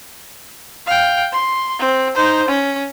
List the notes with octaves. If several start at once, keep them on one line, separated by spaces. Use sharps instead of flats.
F5 G5
C6
C4
D#4 C5
C#4